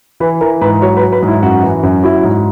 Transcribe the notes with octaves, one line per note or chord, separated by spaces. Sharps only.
E3 B4
E3 A#4
G#2 B4
F#3 C#5
B4
F#3
B4
G#2
E4
F#2 F#4
E3
F#2
F#3 E4
G#2